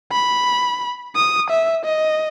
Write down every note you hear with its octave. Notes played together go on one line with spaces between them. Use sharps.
B5
D#6
E5
D#5